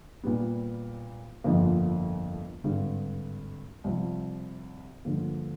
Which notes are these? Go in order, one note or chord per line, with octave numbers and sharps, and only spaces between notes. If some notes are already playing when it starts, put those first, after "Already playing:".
A#2 G3 B3
G1 F2 D3 F3 A#3
G#1 G2 D3
C2 C3 F3
G2 D3 F3 A#3